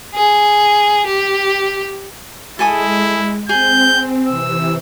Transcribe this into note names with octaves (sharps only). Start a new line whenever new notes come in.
G#4
G4
G#3 E4 A4 G#5 D#6
C4 G#4 G6
C3 E3 E6